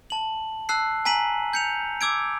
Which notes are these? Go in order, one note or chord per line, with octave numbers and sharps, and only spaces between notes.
A5 F#7
A5 E6 F#6 C7
G#5 A#5 B6 D#7 F#7
G6 C#7 F7
D6 E6 G#6 D7